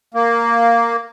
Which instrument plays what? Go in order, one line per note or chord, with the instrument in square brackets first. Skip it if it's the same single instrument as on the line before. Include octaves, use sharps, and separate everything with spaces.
[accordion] A#3